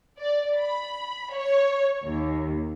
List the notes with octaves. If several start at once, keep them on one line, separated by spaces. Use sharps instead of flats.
D5
B5
C#5
D#2